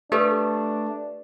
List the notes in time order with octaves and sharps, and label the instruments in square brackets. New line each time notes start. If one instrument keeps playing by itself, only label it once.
[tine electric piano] A3 [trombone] D4 [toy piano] G4 A4 B4